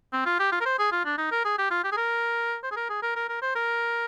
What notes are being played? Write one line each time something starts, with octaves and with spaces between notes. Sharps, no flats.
C4
F4
G4
F4
A#4
C5
G#4
F4
D4
D#4
A#4
G#4
G4
F4
G4
G#4
A#4
C5
G#4
A#4
G#4
A#4
A#4
A#4
C5
A#4